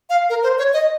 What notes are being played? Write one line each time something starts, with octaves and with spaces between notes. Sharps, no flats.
F5
A#4
C5
C#5
D#5